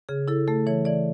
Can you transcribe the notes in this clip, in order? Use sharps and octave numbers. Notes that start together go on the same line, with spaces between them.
C#3 G#4
E4 A4
A3 A4
E3 C#5
E3 D5